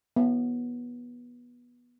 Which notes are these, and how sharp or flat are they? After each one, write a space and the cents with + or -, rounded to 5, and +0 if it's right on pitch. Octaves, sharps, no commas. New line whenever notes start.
B3 -20